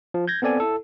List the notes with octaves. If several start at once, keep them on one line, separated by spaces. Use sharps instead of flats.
F3
G6 G#6 A#6
B3 C4 A4 D5 G#5
E4 A4